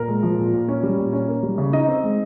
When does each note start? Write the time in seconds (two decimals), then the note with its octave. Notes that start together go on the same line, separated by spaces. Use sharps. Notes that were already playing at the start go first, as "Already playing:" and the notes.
Already playing: A#2 A#4
0.08 G#3
0.23 F3
0.39 A#2
0.54 A#2
0.69 C#4
0.83 G3
0.98 A#2
1.13 C#4
1.28 A#3
1.43 G3
1.58 C#3
1.73 D#4 D#5
1.88 C4
2.04 G#3